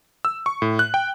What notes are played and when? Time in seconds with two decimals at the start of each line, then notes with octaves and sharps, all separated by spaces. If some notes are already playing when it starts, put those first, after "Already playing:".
0.25 E6
0.46 C#6
0.62 A2
0.79 F#6
0.94 G5